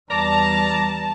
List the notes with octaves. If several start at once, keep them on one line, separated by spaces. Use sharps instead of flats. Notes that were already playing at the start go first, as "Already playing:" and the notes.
E2 G3 D5 A5 A#5